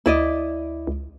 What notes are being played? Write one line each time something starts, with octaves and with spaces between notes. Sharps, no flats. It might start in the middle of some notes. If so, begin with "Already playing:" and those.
D2 E4 D5 D#5
C#2